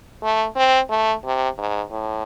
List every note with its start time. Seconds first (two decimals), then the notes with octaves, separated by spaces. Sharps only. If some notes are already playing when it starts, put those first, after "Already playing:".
0.23 A3
0.56 C4
0.90 A3
1.25 C3
1.58 G#2
1.92 A2